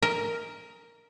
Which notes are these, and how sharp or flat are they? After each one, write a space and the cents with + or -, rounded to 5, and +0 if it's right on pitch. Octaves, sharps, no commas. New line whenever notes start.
A#4 +0 D#5 +30